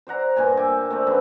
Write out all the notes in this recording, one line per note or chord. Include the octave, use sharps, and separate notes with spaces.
C5 D5 F#5 A#5
G2 A#2 G#5
E5 G5 G#5 D6
A3 C4 D5
F#2 D3 F#3 B4